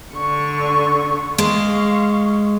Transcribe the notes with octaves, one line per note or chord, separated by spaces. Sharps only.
D3 C#6
G#3 F5 C#6